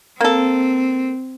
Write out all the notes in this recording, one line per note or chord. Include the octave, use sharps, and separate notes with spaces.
A#3 C4 A4